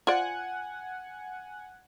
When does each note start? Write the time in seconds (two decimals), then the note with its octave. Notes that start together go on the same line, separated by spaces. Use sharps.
0.07 F4 C5 D5 F#5 G#5